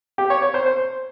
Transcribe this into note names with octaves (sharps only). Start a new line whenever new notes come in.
G4
C#5
C#5
C5
C5